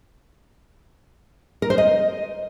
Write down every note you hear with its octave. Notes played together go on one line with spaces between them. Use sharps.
A#4
C5
D#5